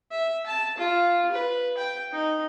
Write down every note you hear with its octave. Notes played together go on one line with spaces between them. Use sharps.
E5
A5
F4
B4
G5
D#4